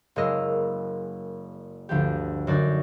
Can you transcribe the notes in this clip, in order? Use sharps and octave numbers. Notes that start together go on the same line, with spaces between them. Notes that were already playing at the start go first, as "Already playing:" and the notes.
F#1 G#3 A#4 D#5 E6
G1 D2 F3 G4
F#2 D3 D#4 F#4 D5 A6